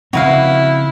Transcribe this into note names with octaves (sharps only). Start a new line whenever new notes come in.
C#3 F3 C4 E4 F#4 B4 F5